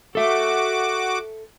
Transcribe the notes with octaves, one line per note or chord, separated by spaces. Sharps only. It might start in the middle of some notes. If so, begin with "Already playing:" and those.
F#4 A4 E5 D6